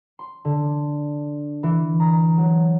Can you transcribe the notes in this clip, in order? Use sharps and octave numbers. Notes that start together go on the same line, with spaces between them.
C6
D3
E3
A#5
F#3